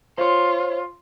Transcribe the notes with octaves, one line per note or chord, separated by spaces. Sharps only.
F4 C5 C#5